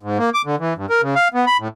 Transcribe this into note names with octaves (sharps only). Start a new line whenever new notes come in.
G#2
A#3
D6
D3
E3
G2
A#4
C#3
F5
B3
B5
A2